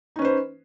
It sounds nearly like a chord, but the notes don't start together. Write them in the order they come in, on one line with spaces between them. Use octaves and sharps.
D#4 C#4 B4 C5